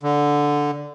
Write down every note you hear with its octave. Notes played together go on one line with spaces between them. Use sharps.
D3